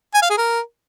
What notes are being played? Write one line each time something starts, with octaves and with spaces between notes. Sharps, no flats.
G#5
F5
G#4
A#4